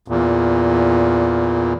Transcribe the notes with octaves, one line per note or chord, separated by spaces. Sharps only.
E2 A#2